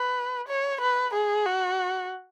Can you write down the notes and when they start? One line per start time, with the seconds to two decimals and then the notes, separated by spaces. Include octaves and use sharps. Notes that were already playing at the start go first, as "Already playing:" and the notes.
Already playing: B4
0.48 C#5
0.81 B4
1.14 G#4
1.46 F#4